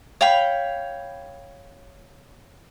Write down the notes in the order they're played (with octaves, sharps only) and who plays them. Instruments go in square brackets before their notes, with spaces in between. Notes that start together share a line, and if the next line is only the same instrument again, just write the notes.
[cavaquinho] C#5 F5 G5 B5